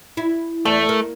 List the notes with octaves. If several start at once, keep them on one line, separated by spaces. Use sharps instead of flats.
E4
E2 A3
A#3